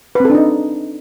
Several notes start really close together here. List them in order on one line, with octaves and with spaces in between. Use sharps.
B4 C4 A4 D4 D#4